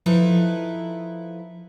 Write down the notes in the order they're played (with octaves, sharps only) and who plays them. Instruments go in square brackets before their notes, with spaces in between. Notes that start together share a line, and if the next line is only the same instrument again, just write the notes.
[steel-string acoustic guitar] F3 D#4 E4 A4 B4